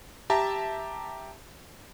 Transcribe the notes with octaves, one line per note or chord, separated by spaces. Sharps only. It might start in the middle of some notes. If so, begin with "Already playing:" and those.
G4 E5 A5 A#5